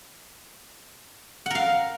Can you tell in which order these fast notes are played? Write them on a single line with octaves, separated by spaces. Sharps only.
F#5 A#4 F5